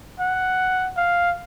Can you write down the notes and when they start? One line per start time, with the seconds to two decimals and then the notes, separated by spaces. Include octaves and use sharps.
0.20 F#5
0.97 F5